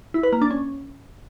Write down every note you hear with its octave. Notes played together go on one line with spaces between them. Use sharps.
E4
B4
A#3
D4
C#4